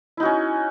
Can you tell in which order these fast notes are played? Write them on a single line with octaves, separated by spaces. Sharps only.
E4 D#4 F#4 C#4